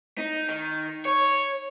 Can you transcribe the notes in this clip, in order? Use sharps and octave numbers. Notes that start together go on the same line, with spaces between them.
D#4
D#3
C#5